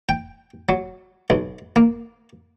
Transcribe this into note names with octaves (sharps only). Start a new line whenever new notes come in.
G5
F#3
B1
A#3